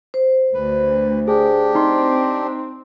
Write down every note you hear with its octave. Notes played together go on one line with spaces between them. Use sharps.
C5
D2 B4
D4 G4 G#4
C4 D#4 C6